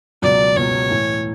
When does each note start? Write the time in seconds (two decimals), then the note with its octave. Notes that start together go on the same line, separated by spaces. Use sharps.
0.22 C#2 B2 F#3 D5
0.56 C#2 B2 F#3 C#5
0.90 A2 E3 A3